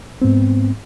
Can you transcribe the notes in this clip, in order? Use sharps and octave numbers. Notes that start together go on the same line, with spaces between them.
G#2 B3 C4